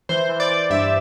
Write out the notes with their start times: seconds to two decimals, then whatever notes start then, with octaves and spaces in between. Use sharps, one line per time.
0.09 E3 C5
0.29 E3
0.40 D5
0.50 E3
0.70 G2 E5